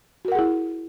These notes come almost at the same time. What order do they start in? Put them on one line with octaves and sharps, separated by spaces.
F#4 A#4 F#5 G#4 E4